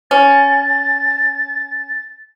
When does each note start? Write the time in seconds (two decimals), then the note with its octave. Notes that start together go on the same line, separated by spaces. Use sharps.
0.11 C#4 A6